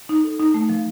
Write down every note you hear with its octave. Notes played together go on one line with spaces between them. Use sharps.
D#4
A4
D#4
A3
F3